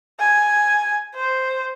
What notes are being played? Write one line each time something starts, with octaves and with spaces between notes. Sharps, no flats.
G#5
C5